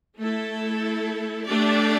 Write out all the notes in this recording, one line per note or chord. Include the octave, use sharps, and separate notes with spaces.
A3 E4 A4
A3 D4 G4 D5